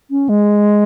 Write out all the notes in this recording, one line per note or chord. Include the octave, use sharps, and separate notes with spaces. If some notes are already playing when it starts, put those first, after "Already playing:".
C#4
G#3